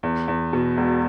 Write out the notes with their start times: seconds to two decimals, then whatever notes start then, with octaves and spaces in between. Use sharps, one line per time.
0.03 E2
0.28 E2
0.53 B2
0.77 E1